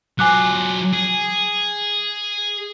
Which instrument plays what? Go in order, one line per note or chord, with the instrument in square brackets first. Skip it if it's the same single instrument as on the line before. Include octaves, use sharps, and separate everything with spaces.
[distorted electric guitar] F#3 F4 [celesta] G#5 D6 F#6
[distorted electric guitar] G#4